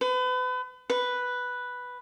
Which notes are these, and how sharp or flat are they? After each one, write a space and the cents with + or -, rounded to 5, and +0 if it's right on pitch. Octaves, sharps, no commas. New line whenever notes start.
B4 +35
B4 +0